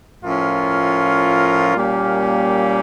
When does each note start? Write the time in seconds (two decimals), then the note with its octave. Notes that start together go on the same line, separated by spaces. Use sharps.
0.22 A2 F3 C#4 F4 A#4
1.76 A#2 G3 A#3 C#4 G4